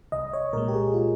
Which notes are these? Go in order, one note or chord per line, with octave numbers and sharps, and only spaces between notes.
C2 D#5
C#5
A#2 G#3 A#4
G4
G#4
F4